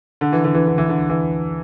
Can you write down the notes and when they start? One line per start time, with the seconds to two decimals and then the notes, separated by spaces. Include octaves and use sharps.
0.21 D3
0.33 E3
0.44 D3
0.54 E3
0.67 D3
0.78 E3
0.89 D3
1.10 E3